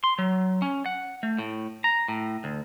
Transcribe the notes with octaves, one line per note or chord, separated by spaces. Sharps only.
C6
F#3
C#4
F#5
A3
A2
A#5
A2
D2